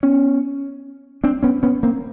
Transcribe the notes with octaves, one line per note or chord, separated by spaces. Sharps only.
B3 C#4
C4 D4
B3 C#4
B3 C#4
A#3 C4